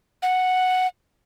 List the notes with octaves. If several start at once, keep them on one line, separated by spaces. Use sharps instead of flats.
F#5